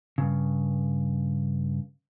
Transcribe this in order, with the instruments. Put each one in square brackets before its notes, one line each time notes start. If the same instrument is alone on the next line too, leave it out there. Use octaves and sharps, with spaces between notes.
[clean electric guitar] G2 A#2 C#3